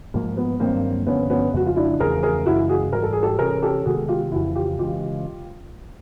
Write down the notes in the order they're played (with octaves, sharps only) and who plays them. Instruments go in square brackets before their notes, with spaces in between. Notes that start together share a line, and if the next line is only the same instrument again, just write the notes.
[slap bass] G#2 F3 G#3 [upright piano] A#3
[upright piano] B3
[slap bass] G2 D#3 F#3 [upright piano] A#3 C4
[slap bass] G2 D3 F3 [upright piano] B3 C#4
[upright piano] B3 C#4
[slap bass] F2 C#3 F3 G#3 [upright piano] F#4
[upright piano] F4
D4 E4
[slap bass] E2 C#3 F3 A3 [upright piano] G#4 A#4
[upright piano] G#4 A#4
[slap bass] F#2 C#3 E3 G#3 [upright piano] E4 F#4
[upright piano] F#4 G#4
[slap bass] G#2 E3 G3 [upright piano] A#4
[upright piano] A4
G#4
G4 A4
[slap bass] C3 E3 A3 C#4 [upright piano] G#4 A#4
[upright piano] G4 A4
[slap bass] C3 D#3 G#3 B3 [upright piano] F#4 G#4
[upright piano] F4 G4
[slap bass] F2 C#3 E3 [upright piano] E4 F#4
[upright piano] F4 G4
[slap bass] C#3 E3 G#3 [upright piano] F4 G4